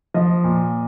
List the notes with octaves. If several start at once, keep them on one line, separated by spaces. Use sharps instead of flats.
F3 D#5
A#2